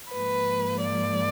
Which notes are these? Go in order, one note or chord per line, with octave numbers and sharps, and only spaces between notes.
G#2 F3 A#3 B4
D5